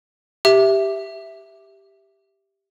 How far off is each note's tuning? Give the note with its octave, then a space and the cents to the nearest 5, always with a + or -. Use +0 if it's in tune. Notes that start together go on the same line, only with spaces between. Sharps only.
G4 +0 E5 +0